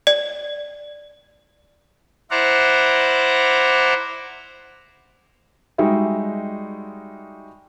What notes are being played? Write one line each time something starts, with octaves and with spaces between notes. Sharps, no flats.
D5
E4 C5 D5 F#5 A#5
G3 G#3 D#4 F#4 E5